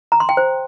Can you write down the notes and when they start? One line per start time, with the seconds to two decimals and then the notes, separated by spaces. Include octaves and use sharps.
0.12 A#5
0.20 C6
0.29 G5
0.37 C5